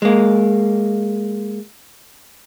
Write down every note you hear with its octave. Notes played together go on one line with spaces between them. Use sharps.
G#3 A#3